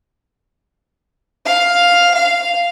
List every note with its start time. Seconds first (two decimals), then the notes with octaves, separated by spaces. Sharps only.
1.46 F5
2.14 F5